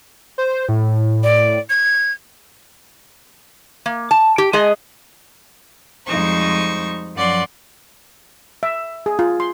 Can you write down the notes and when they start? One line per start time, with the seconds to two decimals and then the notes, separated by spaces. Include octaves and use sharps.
0.38 C5
0.69 A2
1.23 D5
1.70 G#6
3.86 A#3
4.11 A5
4.38 G4
4.53 G#3 G#4 D#5
6.06 F2 G3 G#3 D#4 C5 C#6
7.15 F#2 F3 C#4 D5 F#5 C6
8.63 E5
9.06 G#4
9.19 F4
9.40 C6